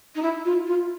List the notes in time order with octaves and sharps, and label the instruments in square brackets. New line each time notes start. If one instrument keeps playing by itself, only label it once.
[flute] D#4
E4
F4
F4